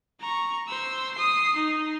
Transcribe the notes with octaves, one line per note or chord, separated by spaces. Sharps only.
A#5 C#6
C5 E6
D#6 C7
D#4